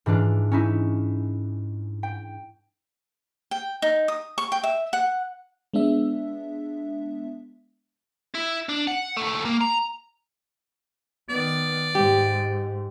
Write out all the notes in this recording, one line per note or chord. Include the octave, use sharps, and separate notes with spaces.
G#2 E3 D4 F4
C#4 D#4 E4
G5
G5
D#4
D#6
C#6
G5
E5
F#5
G#3 B3 D4 E5
E4
D4
F#5
D#2 A3
A#3
A#5
D#3 B3 D5
G#2 G4